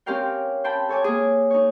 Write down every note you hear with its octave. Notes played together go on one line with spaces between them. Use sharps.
C4 C#4 G4 A#4 F5 G5
C5 G5 A5 B5
A4 C#5 G#5 D6
A#3 G#4
D#4 C#5